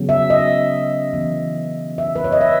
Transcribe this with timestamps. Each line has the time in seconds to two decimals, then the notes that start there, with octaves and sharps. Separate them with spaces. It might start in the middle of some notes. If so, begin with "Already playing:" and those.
Already playing: C#3 F#3 B3
0.09 E5
0.30 D#5
1.13 E3 B3
1.98 E5
2.16 B4
2.24 C#5
2.32 D#5
2.41 E5